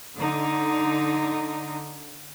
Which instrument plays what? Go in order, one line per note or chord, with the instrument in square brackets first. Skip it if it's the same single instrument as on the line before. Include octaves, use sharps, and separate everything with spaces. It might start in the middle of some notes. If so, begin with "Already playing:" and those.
[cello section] D3 D#4